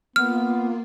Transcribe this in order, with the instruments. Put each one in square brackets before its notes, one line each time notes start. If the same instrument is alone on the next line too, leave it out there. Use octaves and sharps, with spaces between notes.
[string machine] A#3 F4 [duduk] B3 [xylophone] F6